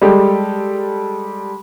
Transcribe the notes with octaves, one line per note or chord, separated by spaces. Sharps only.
G3 G#3 G4 A4